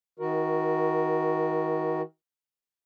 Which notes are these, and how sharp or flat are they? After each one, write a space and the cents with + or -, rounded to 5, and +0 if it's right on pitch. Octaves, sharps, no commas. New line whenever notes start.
D#3 +35 F#4 +0 A#4 +15